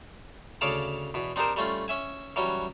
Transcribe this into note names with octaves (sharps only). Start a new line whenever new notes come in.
D2 C#3 C#5 D5 F5 A5
E2 B2
C4 D4 D#4 G4 A#4 C5
G3 A3 C#4 F4
C#4 E5 G#5
E3 F#3 G3 C#4